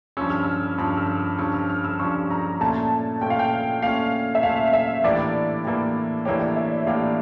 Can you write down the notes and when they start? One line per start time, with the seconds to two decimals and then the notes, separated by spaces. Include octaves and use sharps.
0.17 G2 F3 C#4 E6
0.30 F6
0.43 E6
0.78 G2 F3 C#4
0.88 F6
0.97 E6
1.06 F6
1.38 G2 F3 C#4 E6
1.54 F6
1.69 F6
1.84 E6
1.99 G2 F3 C#4 C#6
2.31 A#5
2.61 A#2 A3 C#4 A5
3.21 A#2 A3 C#4 G5
3.30 F5
3.39 G5
3.82 A#2 A3 C#4 F5
4.35 E5
4.43 A#2 A3 C#4 F5
4.73 E5
5.04 A2 E3 A#3 D4 G4 D5
5.65 A2 E3 A#3 D4 G4
6.25 A2 E3 A#3 D4 G4 C#5
6.41 D5
6.56 E5
6.71 D5
6.87 A2 E3 A#3 D4 G4 F5